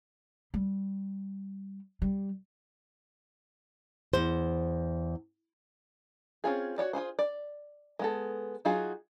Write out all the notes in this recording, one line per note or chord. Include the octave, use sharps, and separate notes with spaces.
G3
G3
E2 C5
C4 C#4 F4 G#4
F#4 A4 C#5 D5
F4 F#4 G#4 C5
D5
G#3 B3 A4
F#3 D#4 F4 F#4 G#4